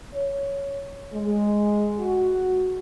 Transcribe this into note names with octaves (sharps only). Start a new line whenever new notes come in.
C#5
G#3
F#4